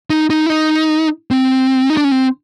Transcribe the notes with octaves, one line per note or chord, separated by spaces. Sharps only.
D#4
D#4
E4
D#4
C4
D#4
D4
C#4
C4